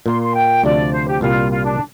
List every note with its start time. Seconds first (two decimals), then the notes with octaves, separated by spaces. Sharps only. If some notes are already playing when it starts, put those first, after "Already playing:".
0.06 A#2 A#3 F4 C6
0.20 C6
0.35 G5
0.64 D2 C3 F3 D4 D5
0.93 C5
1.07 G4
1.21 C2 A#2 G3 F4
1.51 F4
1.64 D4